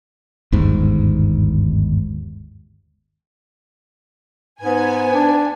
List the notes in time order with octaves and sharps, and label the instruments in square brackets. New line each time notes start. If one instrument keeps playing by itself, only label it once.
[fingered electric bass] G1 D#2 G#2
[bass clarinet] G#2 [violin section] B3 G#5
[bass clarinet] D4